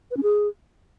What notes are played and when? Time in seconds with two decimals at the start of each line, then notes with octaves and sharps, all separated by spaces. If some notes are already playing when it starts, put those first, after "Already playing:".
0.11 B4
0.17 C#4
0.23 G#4